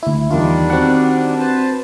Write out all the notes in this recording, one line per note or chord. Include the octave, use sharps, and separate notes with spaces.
D2 E4
E2 D#3 G3 D4 F4
C4 F#4 F#5
B4 C5 A5